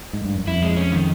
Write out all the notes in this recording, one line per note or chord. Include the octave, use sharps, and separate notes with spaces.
G#2
G2
F#2
F2 E4
G#3
C#4
D#3